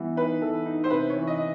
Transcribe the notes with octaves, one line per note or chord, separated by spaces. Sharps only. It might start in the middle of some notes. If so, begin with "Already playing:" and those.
Already playing: E3 G3 B3
D#4 B4
E3 A4
D#4
C5
C3 B4
C#5
E3
D#5